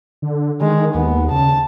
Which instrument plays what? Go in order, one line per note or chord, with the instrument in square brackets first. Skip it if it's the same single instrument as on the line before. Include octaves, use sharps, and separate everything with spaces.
[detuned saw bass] D3
[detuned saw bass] D#3 [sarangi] G#3
[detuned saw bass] D#2 [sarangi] B3
[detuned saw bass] C#3 [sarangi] A5